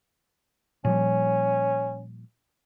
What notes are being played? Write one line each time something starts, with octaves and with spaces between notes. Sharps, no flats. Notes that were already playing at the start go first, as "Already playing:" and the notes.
A#2 F3 G3 C#4